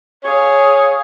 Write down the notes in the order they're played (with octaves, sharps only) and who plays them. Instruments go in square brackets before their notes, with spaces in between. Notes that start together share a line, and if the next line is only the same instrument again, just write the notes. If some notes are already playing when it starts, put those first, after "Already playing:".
[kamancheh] G#4 F5 [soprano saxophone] C#5